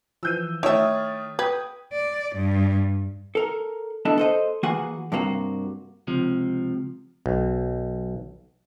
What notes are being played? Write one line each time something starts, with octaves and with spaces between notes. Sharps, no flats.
E3 F3 E6 G6 D#7
D#3 A3 E4 C#5 E5 D#6 F6 A6
B4 G5 D#6 G#6
D5
G2
A4 A#4
B3 D4 E4 A4 D#5
A4 C5 D#5
E3 A#3 F#4 G#4 F#5 G#5
G2 C3 A#3 F#4
C#2 C3 F3
B1